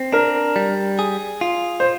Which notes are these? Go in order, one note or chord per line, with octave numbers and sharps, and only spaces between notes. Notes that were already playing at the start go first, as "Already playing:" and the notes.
Already playing: C4
D4 A#4
G3
G#4
F4
C5